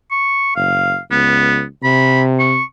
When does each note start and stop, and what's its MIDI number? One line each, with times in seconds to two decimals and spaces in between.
0.11 0.55 85
0.56 0.96 30
0.56 0.98 77
1.11 1.65 37
1.11 1.62 59
1.84 2.59 48
1.84 2.22 83
2.39 2.63 85